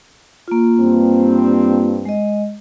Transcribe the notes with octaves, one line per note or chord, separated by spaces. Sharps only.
A#3 F4
G2 C4
G#3 D#5